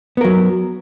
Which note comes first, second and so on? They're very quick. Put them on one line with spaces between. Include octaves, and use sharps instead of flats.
B3 A#4 F#3